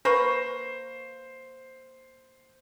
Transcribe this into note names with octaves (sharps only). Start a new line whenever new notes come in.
A#3 B4 C5 C#6